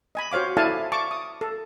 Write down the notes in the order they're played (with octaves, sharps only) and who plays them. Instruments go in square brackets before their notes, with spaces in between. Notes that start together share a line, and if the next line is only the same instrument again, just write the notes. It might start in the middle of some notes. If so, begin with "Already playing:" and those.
[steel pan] D#5 G#5 B5
F#4 C5 C#5 F5 D6
E4 A4 D5 F5 G#5 A5
A5 C#6 D6
D#6
A4